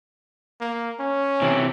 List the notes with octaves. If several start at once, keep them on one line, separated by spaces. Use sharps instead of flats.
A#3
C#4
C3 E3